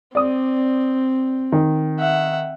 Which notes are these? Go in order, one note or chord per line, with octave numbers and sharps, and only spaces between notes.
C4 D5 D#6
D#3
E5 F#5